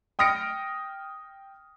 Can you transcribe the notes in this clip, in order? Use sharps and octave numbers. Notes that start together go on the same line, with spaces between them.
G5 D#6 F6 A#6 C#7 D7